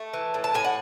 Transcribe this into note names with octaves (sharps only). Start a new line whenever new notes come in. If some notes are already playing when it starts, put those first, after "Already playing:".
Already playing: A3
E3
A2
A5
A2 G#5
F#5